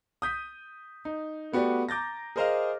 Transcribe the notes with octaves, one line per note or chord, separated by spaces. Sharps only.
D#6 G6 B6 D#7
D#4
A3 B3 F#4 G4 D5
A#5 D6 G6 A6 A#6
G#4 A#4 C5 D#5 F5 F6